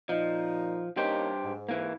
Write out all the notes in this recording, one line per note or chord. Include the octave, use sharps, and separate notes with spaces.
A#2 F3 D#4
G2 A#3 C#4 D#4 G4 C5
G#2
E3 A#3